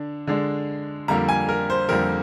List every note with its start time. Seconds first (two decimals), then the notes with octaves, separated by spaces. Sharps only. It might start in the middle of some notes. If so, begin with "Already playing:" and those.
Already playing: D3 D4
0.27 D3 G#3 D4
1.08 F2 D3 G3 A#3 A#5
1.29 G#5
1.49 A#4
1.70 C5
1.89 F2 D3 G3 A#3 A#4